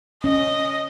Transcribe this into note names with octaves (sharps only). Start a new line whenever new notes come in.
C#4 D#5